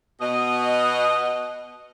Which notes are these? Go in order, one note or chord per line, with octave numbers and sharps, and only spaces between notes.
B2 D#5